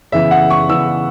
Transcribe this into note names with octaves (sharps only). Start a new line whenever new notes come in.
C#3 E3 B3 E5
F#5
C#6
C#3 E3 B3 E6